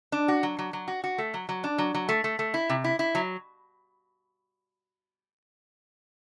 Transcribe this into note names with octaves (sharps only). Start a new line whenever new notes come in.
D4
F#4
F#3
F#3
F#3
F#4
F#4
A3
F#3
F#3
D4
F#3
F#3
A3
A3
A3
E4
C3
E4
E4
F#3